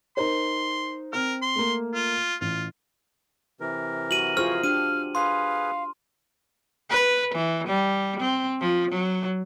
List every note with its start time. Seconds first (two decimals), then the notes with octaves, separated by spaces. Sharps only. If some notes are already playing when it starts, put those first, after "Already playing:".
0.17 D#4 A#4 C5 C6
1.13 C4 A#4 F6
1.42 C6
1.56 A3 A#3
1.95 F4
2.41 A1 F4
3.60 C3 E3 A#4
4.11 F#4 D#7 F#7
4.37 F4 G#4 C5 C#6 F6
4.64 D4 G4 F6 D#7
5.15 G#4 B4 F5 C6
6.90 B4
7.35 E3
7.68 G3
8.20 C4
8.61 F3
8.91 F#3